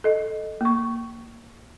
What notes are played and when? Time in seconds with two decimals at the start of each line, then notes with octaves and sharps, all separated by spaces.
0.04 A4 D#5
0.61 A#3 C#6